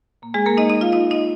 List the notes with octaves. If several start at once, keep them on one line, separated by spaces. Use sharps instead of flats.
A#2 A#3
G#3 G#4
A#3 A#4
D#4 D#5
D#4 D#5
F4 F5
D#4 D#5
D#4 D#5